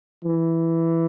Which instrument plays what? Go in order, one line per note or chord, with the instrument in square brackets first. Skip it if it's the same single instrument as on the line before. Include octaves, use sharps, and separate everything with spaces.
[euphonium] E3